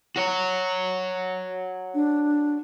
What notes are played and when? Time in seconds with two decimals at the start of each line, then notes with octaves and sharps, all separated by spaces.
0.16 F#4 C#5
1.94 D4